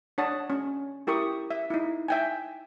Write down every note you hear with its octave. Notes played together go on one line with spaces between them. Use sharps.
D4 C#5 F#5 A5 D#6
C#4
E4 G4 A#4 C#6 D#6
E5
D#4 E4
E5 G5 G#5